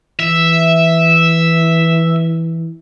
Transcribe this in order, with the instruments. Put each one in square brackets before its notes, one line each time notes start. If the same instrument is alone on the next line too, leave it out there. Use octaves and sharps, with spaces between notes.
[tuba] E3 [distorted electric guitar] E5